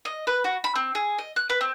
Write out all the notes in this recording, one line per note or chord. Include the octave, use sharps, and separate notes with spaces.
D#5
B4
F#4
B5
C4
G#4
D#5
F#6
B4
C4